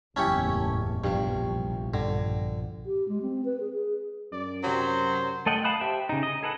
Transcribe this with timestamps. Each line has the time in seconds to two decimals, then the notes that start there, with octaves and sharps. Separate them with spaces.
0.16 F#1 E2 A2 C#4 E4 G4 A5 C#6
1.04 A#1 G2 B2 F3
1.39 C2
1.94 G2 D3
2.86 G4
3.09 G#3
3.22 C4
3.45 B4
3.60 G#4
3.73 G#4
4.32 F#2 D5
4.64 C3 F#3 G4 C5 C#5
5.46 A3 A4 D#5 F#5 G5
5.64 F5 A5 B5 D#6 F#6
5.81 G4 C5 E5 G5
6.09 C#3 D#4
6.23 D#5
6.43 G#4 A4 B4 F#5